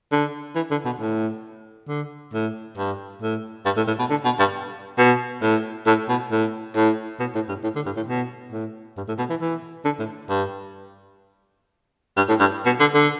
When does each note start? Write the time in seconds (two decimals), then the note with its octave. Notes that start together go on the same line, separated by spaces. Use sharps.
0.12 D3
0.55 E3
0.71 D3
0.85 B2
1.00 A2
1.88 D3
2.34 A2
2.77 G2
3.22 A2
3.65 G2
3.77 A2
3.87 A2
3.99 B2
4.10 D3
4.25 B2
4.39 G2
4.98 B2
5.42 A2
5.87 A2
6.08 B2
6.31 A2
6.76 A2
7.20 B2
7.35 A2
7.49 G2
7.63 A2
7.75 D3
7.86 G2
7.96 A2
8.08 B2
8.52 A2
8.97 G2
9.08 A2
9.19 B2
9.30 E3
9.41 E3
9.85 D3
9.99 A2
10.29 G2
12.17 G2
12.29 A2
12.40 G2
12.65 B2
12.80 D3
12.94 D3